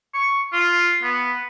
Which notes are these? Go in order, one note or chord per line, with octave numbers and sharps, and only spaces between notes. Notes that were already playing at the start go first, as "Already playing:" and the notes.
C#6
F4
B3